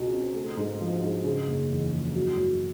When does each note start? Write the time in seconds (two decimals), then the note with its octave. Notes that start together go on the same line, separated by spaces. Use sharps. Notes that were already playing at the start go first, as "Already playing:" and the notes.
Already playing: C#2 B2 G#3
0.12 C4
0.35 A3
0.57 G#2
0.81 F3
1.03 G#2
1.24 C#3
1.47 F#1
1.70 E2
1.92 F3
2.14 F#3
2.37 F#2